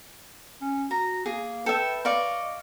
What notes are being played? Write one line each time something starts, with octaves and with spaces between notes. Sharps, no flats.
C#4
F#4 A#5
A#3 G#4
A4 B4 E5 G5
D5 D#5 F5 C#6